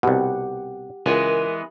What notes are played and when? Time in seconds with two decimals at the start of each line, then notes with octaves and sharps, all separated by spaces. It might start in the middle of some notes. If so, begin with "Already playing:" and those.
0.03 C2 B2 G4 F#5
1.06 C#2 E3 G#3 B3 A#4